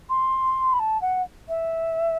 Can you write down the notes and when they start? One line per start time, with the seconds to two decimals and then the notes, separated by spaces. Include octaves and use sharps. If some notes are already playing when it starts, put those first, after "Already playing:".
0.10 C6
0.73 B5
0.79 A5
1.01 F#5
1.48 E5